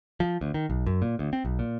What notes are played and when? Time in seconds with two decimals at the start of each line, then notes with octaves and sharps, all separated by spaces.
0.20 F3
0.41 D2
0.54 D#3
0.70 B1
0.86 F#2
1.02 A#2
1.19 D2
1.33 C4
1.45 B1
1.59 A#2